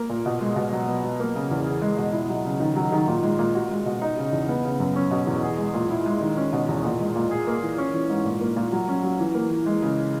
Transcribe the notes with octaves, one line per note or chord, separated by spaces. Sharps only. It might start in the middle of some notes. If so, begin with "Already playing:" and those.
Already playing: A#3 A#4
A#2
B2
G#3
B2
F#3
B3
F#3
A#3
C#3
E2
G#4
G#3
B2
E4
F#3
C#3
D#3
F#3
D#3
A#2
G#3
A#2
F#4
G#3
B2
D#4
C#3
E2
B3
C#3
F#2
C#4
B2
E2
G#4
G#3
A#2
E4
G#3
D#3
C#4
B2
E2
A#2
G#3
A#2
G#4
A#3
E3
C#4
E3
G#2
A#2
A#3
A#2
F#3
C#4
F#3
E3
A#3
E3
G#3
C#3